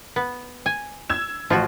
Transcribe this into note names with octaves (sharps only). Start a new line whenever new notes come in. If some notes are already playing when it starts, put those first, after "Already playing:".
B3
G#5
E6 G#6 E7
A1 F3 F4 F#4